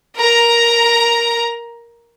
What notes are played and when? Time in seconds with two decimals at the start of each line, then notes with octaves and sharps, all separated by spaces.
0.16 A#4 A#5